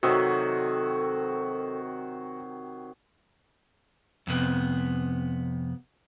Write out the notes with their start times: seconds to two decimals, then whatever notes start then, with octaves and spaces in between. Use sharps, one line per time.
0.03 C3 D#3 F#3 F#4 A4 D#6 E6
4.27 F2 C3 B3